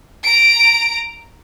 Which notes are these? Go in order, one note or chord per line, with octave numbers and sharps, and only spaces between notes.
A#5 D7